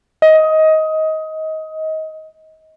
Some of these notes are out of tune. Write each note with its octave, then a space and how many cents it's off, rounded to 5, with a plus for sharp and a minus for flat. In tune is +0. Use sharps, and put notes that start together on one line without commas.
D#5 +20